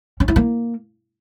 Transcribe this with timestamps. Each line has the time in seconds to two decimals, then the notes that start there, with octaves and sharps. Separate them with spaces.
0.20 C#4
0.28 E4
0.36 A#3